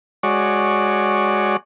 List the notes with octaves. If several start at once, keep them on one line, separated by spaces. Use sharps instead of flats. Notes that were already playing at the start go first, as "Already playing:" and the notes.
G#3 F#4 C#5 D5